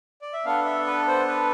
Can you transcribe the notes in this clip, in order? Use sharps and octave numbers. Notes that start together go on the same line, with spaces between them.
D5
E5
B3 D4 A4 F5
E5
B4
C5
B4